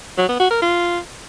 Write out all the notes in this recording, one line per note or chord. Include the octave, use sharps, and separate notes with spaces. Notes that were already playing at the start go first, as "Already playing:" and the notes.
F#3
B3
F#4
A#4
F4